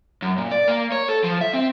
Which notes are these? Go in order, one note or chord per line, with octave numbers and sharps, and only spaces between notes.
F#2
A#2
D5
A#3
C#5
A4
F3
E5
C4